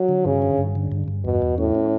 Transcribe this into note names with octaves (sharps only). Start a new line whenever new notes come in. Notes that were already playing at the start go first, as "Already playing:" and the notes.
Already playing: F#3
D3
G2 C#3
D3
G2
D3
G2
G2
E2 B2
E2
A2 C#4
C#4